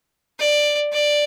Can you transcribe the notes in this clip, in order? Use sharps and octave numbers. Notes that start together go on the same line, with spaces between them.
D5
D5